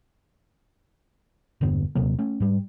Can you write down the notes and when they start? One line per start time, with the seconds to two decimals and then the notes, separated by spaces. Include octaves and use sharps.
1.61 E1 G2 D3 B3
1.95 D#1 C3 F#3 A#3
2.19 A3 C#4
2.40 G#2 G3